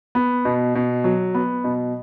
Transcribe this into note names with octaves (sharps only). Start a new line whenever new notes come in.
B3
B2
B2
F#3
B3
B2